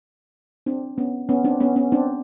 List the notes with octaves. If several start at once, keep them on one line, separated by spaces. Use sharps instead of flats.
C4 D4
B3 C#4
B3 C#4
C4 D4
B3 C#4
B3 C#4
C4 D4